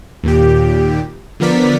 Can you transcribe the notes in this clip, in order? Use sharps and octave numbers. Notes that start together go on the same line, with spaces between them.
D#2 A#2 G4
D3 F3 B3 A#4 D5 B6